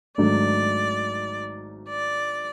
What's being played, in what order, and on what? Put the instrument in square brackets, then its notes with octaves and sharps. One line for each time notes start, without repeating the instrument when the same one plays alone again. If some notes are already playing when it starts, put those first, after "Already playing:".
[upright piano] G#1 G#2 F#3 A3 D4 [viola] D5
[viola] D5